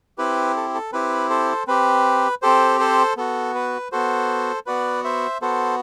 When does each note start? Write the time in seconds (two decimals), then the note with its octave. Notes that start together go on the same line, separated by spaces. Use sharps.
0.18 C4 E4 G4 B4
0.56 A4
0.75 A4
0.92 C4 E4 G4 B4
1.30 A4 C5
1.67 C4 G4 B4
2.42 C4 G4 A4 C5
2.79 A4 C5
3.17 B3 F#4 A4
3.55 B4
3.92 B3 F#4 A4 C5
4.66 B3 F#4 B4 D5
5.04 C5 E5
5.42 B3 F#4 A4 C5